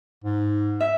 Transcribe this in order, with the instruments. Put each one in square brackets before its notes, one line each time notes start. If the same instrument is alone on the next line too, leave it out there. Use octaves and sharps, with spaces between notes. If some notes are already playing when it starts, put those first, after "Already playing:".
[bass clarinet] G#2
[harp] E5